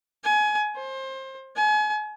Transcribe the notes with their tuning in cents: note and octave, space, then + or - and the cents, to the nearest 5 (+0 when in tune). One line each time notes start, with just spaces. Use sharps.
G#5 +25
C5 +25
G#5 +35